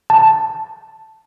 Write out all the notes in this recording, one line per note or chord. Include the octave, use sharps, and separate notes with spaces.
A5